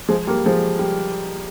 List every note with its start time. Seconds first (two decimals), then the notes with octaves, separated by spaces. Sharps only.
0.09 F3 G#3
0.27 G3 A#3
0.46 F3 G#3
0.79 G3